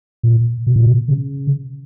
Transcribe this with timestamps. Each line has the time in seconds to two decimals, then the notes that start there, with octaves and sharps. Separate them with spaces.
0.23 A#2
0.67 B2
0.76 A#2
0.86 B2
1.08 C#3